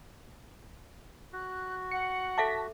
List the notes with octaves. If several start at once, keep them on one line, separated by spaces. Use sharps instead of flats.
F#4 F#6
F#5 C#7
A4 E5 A5 D6 A#6 B6